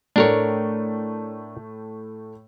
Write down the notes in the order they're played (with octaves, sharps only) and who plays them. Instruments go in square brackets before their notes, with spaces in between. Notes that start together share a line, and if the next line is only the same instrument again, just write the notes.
[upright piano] A2 A3 [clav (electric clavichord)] D4 A#4 C#5